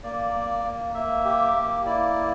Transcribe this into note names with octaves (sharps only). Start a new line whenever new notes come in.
A#3 D5
A#3
A#3
A#3 E5
G4
A#3
E4 D5
A#3